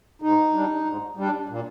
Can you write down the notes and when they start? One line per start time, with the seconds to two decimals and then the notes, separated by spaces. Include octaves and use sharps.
0.22 G#2 D#4
0.54 G3 D4
0.86 G#2
1.17 G3 D4
1.49 A#2